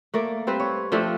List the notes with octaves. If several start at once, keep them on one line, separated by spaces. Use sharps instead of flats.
A3 A#3 D5
G3 C4 B4
C#5
F3 A3 C4 D4